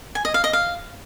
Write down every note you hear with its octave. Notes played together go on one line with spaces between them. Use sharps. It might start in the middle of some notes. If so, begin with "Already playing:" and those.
G#5
D#5
F5
D#5
F5